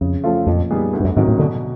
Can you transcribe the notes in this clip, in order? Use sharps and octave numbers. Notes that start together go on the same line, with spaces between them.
F2 C#3
F3 A3 C#4 F4
F2 A#2
G3 B3 D#4 G#4
D2
G2
F#2
G#2 C3 D#3 F#3
A2
B2 D3